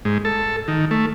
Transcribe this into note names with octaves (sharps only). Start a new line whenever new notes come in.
G#2
A4
D#3
A3